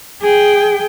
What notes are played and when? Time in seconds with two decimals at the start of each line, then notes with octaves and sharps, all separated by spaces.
0.22 G#4 G5